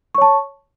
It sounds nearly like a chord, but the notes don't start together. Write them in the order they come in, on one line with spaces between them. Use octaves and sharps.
C#6 C#5 A5